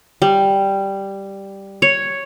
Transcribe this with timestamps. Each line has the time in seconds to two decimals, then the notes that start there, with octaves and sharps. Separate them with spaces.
0.22 G3
1.82 C#5